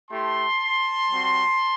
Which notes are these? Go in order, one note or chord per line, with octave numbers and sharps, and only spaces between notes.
A3 E4 G4 A5 C6
G3 C4 F#4